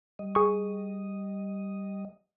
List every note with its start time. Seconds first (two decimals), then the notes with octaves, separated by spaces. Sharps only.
0.19 G3 D#5
0.35 G#4 C#6